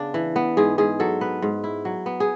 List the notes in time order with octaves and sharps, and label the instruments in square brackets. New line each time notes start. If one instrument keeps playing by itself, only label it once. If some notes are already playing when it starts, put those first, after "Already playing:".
Already playing: [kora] C#3 B3 D4
E3
B3
G#2 G#4
G#2 G#4
F#3 A4
B3 B4
G#2
E4
F#3
B3
G#4